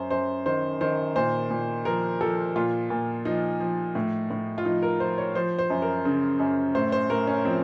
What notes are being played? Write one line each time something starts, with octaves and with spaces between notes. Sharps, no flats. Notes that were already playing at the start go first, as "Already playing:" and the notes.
Already playing: F#2 C5
F#2 C5
D#3 C5
D#3 C5
A#2 C5
A#2
F3 A#4
F3 A4
A#2 F4
A#2
F3 D#4
F3
A2
A2
F4
F3 D#4
A#4
F3 C5
C#5
F3 C5
C5
F#2
A#4
C#3
F#2
A2 C5
C5
A2 A#4
C#4
F3 C4